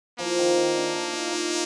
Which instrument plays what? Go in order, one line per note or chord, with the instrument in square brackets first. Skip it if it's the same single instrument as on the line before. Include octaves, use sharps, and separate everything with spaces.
[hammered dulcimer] F3 [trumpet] A#3
[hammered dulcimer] D#3
D#3
D4
D#4
F4
D#4